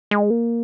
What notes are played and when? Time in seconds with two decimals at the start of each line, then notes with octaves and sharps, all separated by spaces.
0.11 G#3
0.30 A#3